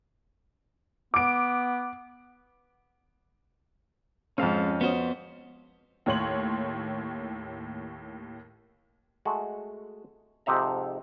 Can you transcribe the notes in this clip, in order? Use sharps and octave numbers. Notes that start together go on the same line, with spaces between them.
B3 D6 D7
F2 G#2 C4 C#4 F5 A5
B3 F#4 C5 C#5 D#5
D#2 A2 C#5 C6 F#7
G#3 A3 F#4
F2 G#2 C3 D#4 E5 A#5